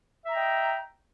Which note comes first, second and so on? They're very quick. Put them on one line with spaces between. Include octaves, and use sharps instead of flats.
E5 A#5 G5 D#5